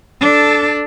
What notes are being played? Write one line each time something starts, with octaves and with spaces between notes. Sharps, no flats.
D4 A4